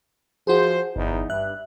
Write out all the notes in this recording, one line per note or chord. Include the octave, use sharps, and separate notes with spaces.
F3 F#4 G#4 C5
G1 E2 D#4
G2 E5 F#6